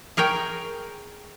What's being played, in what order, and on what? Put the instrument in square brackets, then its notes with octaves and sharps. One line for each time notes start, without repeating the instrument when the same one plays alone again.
[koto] G#4 A#4 C#5 G5